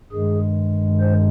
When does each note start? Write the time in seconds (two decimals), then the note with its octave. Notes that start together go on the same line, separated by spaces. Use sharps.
0.12 G2 D#3 G#3 G#4
1.00 C5